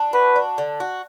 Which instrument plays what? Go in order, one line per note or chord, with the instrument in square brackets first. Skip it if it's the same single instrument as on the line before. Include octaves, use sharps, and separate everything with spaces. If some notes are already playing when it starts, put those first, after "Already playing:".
Already playing: [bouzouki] D4
[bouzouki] F#4 [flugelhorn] B4
[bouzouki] D4
D3
F#4